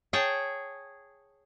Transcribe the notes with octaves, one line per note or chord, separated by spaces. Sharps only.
G#4 C#5 G5 A5